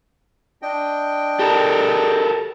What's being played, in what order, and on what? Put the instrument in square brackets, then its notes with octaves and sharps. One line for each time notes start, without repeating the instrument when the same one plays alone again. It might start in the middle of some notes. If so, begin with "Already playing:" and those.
[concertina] D4 D#5 G5
[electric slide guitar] G4 A4 A#4